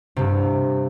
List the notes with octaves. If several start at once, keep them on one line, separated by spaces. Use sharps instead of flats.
G2 C3